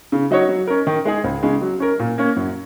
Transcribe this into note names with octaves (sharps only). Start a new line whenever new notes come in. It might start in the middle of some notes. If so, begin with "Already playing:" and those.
C#3
F#3 D#4 F#4 C#5
F#3
C#4 A#4
D#3
G#3 D#4 G#4
C#2
C#3 G#3
F#3
C#4 A#4
A#2
A#3 C#4
F#2